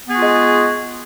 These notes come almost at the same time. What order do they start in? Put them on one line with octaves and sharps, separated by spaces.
B3 G#4 F#4 F4 G#3